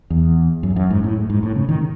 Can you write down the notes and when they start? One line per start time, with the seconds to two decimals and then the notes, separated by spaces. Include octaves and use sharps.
0.10 E2
0.63 F#2
0.76 F#2
0.90 G#2
1.04 A2
1.30 G#2
1.43 A2
1.56 C#3
1.69 D#3